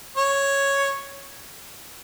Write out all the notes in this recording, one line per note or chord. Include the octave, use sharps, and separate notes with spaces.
C#5